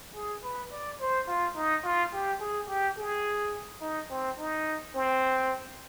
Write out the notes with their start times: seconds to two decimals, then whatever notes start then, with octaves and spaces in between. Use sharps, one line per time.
0.15 G#4
0.43 B4
0.71 D5
1.00 C5
1.28 F4
1.55 D#4
1.84 F4
2.13 G4
2.40 G#4
2.69 G4
2.98 G#4
3.81 D#4
4.10 C4
4.38 D#4
4.95 C4